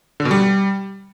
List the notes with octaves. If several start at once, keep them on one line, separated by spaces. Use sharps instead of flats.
D3
B2
G3